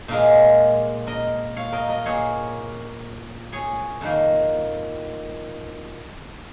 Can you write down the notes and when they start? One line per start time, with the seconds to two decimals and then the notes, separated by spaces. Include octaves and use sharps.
0.08 A#2 G#3 F4 A#4
1.07 A#4 D#5
1.56 C#5 F5
1.72 A#4 D#5
1.89 A#4 D#5
2.05 A#2 A#3 G#4 C#5
3.52 G#4 C#5
4.01 F2 D#3 A#3